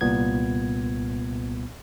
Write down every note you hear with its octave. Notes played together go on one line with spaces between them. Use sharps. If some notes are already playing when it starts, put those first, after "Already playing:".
C2 A#2 B3 G#6